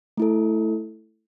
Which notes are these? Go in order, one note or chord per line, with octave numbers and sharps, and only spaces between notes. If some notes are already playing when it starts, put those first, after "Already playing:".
A3 E4 A4